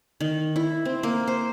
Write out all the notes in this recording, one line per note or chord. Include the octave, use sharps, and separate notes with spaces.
D#3
E4
C4
A#3
C5